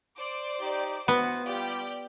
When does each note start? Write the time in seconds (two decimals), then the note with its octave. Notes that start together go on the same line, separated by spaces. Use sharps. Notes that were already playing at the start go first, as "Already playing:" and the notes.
0.17 C5 D5 D6
0.60 D#4 G4
1.08 E3 B3 F#4 C5
1.45 G3 F4 G4 D5 G5